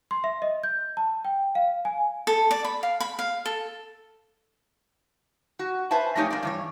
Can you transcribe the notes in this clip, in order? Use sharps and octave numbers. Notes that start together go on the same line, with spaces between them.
C6
E5
D#5
G6
A5
G5
F5
G#5
A4
D5
B5
F5
B5
F5
A4
F#4
B4 C5 E5 G#5 A5
F2 A3 D#4 G4 C#5 G#5
A#3 C4 D4 D5
G2 E3 C#5